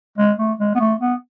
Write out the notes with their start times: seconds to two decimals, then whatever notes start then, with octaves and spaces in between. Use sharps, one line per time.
0.18 G#3
0.38 A3
0.60 G#3
0.75 B3
0.80 A3
1.00 B3